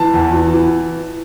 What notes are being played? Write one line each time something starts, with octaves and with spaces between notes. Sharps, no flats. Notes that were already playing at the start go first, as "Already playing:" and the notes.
Already playing: E3 A5
E2
E3
E3